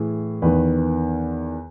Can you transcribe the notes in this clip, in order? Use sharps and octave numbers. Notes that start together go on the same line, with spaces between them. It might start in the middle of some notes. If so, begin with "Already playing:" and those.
Already playing: A2 E3 G#4
E2 D#3 B4